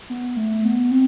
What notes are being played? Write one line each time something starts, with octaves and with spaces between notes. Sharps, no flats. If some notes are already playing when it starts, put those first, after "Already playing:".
B3
A3
B3
C4